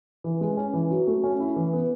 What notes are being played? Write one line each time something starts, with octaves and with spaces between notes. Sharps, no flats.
E3
G#3
C#4
E3
F#3
A3
C#4
E4
E3
B3